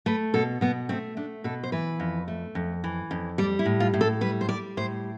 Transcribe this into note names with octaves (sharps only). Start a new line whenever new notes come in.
A3 B4
B2 A4
B2 B3
A3 C4
A3 D4
B2 A4
C5
E3 B4
F2
A3
F2
E3
F2
G3 D5
E4
A2
F4
A2
A4
G3 B4
C5
G3 D5
A2 C5